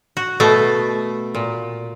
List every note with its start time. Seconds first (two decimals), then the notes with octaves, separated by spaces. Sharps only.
0.17 F#4
0.40 B2 A3
1.35 A#2